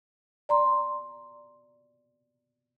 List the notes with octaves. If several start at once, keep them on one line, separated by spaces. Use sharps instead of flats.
D5 A#5 C6